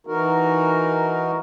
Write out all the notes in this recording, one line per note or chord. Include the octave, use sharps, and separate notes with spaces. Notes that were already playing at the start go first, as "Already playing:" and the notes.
E3 D#4 F#4 A#4